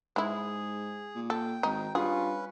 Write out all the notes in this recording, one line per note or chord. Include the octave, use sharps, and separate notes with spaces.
G#2 G#3 E4 G#4
A#2
A4 G5
G#1 D#4
G2 C#4 F4 G#4 B4